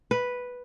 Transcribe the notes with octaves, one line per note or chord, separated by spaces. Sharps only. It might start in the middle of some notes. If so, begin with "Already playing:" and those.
B4